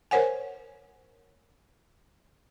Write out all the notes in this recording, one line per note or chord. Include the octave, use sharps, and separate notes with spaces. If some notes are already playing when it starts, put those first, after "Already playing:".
A#4 C5 C#5 F#5 G#5